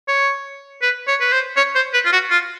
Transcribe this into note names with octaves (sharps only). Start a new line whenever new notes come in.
C#5
B4
C#5
B4
C5
C#5
C5
B4
F4
F#4
F4